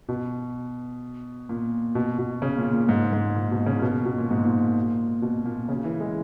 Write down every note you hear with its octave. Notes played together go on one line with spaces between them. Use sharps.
B2
A#2
B2
B2
C#3
A#2
A#2
G#2
G#2
A#2
B2
C#3
A#2
B2
B2
A#2
G#2
A#2
B2
A#2
C#3
E3
G#3